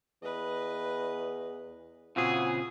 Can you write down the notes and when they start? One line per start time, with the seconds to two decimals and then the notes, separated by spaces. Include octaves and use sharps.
0.22 E2 B4 D#5
2.16 A#2 C#3 E3 C4 F4 F#4 G#4 D#6